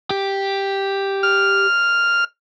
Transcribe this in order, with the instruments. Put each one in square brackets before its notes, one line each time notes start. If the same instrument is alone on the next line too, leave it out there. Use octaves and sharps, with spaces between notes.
[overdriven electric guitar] G4
[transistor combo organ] F6